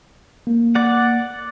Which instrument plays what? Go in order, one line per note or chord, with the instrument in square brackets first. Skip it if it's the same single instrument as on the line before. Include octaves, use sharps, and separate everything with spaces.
[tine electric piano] A#3
[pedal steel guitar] D5 F#5